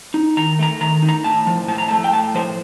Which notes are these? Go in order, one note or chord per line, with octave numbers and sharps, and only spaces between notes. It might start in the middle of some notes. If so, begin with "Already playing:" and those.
D#4
D#3 A#5
A3 A#5
D#3 A#5
D#4
A#5
A2 A5
F3
A2 A5
A#5
A5
A3
G5
A2 A5
F3 C5